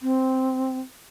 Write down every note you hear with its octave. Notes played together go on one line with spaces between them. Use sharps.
C4